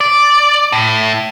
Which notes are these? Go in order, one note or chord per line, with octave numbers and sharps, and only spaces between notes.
D5
A2